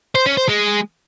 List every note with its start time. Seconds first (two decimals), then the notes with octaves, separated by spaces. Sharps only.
0.15 C5
0.26 C#4
0.37 C5
0.48 G#3